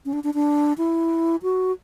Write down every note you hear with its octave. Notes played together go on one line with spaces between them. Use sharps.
C#4
D4
D4
D4
E4
F#4